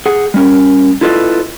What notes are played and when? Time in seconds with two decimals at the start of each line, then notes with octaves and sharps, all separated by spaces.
0.06 G#4 F#5
0.34 G3 C#4 A#4
1.01 E4 F4 A4 B4 D5 D#5